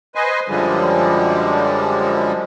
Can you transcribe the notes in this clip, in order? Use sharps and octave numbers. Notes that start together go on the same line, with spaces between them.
B4 C5 D#5 G#5
F#2 D3 F3 G3 G#3